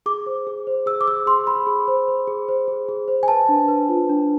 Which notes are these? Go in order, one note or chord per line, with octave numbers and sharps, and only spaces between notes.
G#4 D6
C5
G#4
C5
G#4 E6
D6
G#4 E6
G#4 C6
G#4 B5
G#4
C5
C5
G#4
C5
G#4
G#4
C5
G#5
B4 A5
D4
B4
F4
D4